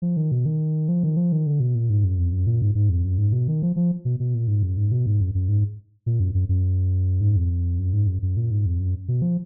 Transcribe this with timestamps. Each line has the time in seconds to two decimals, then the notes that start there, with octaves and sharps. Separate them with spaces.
0.02 F3
0.17 D#3
0.31 B2
0.46 D#3
0.89 F3
1.03 D#3
1.17 F3
1.32 D#3
1.46 D3
1.60 B2
1.75 A#2
1.90 G#2
2.04 F#2
2.19 F2
2.32 F#2
2.47 A#2
2.62 G#2
2.75 G#2
2.89 F2
3.05 F#2
3.18 G#2
3.32 B2
3.48 D#3
3.62 F3
3.76 F3
4.05 B2
4.20 B2
4.34 A#2
4.48 G#2
4.63 F#2
4.77 G#2
4.92 B2
5.06 G#2
5.20 F#2
5.35 F#2
5.49 G#2
6.06 A#2
6.20 F#2
6.35 F#2
6.49 F#2
7.21 G#2
7.36 F2
7.79 F#2
7.93 G#2
8.07 F#2
8.22 F#2
8.37 A#2
8.51 G#2
8.66 F2
8.80 F#2
9.08 B2
9.22 F3